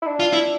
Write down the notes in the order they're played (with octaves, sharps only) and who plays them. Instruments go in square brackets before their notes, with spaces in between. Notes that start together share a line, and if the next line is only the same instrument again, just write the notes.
[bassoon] E4
D4
[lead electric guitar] F4
E4